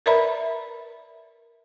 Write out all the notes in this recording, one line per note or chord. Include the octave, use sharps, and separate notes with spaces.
A#4 B4 D5 E5 A#5 B5